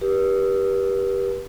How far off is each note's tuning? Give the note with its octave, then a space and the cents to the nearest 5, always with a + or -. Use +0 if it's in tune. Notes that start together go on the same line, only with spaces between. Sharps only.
G4 +0 B4 -40